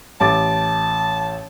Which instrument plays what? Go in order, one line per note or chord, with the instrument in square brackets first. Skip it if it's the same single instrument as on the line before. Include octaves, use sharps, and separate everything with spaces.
[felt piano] A1 D6 A6 [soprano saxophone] A5